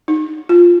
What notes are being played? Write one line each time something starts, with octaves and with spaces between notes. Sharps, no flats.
D#4
F4